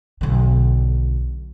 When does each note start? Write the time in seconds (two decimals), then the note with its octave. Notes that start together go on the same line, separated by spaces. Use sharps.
0.21 B1 D3